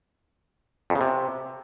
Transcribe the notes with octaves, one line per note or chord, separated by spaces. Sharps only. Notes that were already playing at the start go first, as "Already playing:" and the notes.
F2
C#3
C3